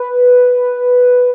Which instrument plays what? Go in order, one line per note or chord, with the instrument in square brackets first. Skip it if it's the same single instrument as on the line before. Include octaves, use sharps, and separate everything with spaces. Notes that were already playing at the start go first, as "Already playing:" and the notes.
Already playing: [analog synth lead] B4